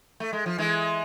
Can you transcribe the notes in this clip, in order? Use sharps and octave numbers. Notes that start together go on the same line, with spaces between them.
A3
G#3
F3
E3 G#3